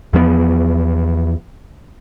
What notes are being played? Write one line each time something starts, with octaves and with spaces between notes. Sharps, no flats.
E2 F3 A3 B3